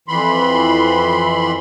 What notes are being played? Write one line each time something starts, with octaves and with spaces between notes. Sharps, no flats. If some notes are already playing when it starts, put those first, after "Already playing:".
F2 E3 B5 C6